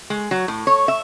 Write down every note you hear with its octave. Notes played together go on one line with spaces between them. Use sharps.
G#3
F#3
A2
C#5
E5